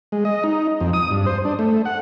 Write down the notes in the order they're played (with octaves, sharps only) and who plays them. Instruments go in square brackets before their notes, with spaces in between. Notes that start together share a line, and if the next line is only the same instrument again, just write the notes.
[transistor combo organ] G#3
D#5
D#4
F2
D#6
G2
C5
D4
A3
F#5